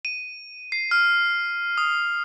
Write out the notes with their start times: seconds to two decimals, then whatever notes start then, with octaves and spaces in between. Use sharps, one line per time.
0.05 D#7
0.72 C7
0.91 F6
1.78 D#6